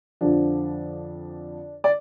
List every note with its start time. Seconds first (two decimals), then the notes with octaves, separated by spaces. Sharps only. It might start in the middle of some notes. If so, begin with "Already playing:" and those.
0.21 F2 D3 F3 D4
1.84 D5